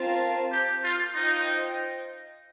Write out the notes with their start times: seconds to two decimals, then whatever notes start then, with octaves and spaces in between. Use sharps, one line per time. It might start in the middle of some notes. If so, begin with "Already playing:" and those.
Already playing: C4 F4 A#4 F5 A5
0.52 G4
0.84 F4
1.15 D#4 F4 C5 D#5 G5